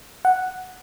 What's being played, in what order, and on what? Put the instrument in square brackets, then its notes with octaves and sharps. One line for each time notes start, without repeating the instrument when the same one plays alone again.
[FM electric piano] F#5